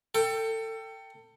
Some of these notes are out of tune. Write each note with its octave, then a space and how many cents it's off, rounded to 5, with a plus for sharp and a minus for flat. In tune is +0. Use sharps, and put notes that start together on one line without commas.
A4 +25 G5 +0